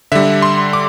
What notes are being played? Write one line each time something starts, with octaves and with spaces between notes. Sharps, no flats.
D3 G3 E5
C6
D6